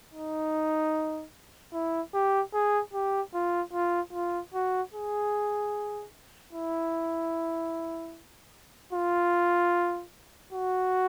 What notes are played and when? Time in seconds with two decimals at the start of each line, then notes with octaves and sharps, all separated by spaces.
0.13 D#4
1.73 E4
2.14 G4
2.53 G#4
2.93 G4
3.34 F4
3.73 F4
4.13 F4
4.54 F#4
4.94 G#4
6.53 E4
8.93 F4
10.52 F#4